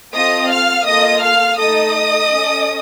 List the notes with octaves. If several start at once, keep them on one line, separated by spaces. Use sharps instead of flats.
C4 F4 A4 D#5 D#6
F5 F6
A#3 F4 A4 D#5 D#6
F5 F6
A3 D#4 A4 D#5 D#6
C#4 A4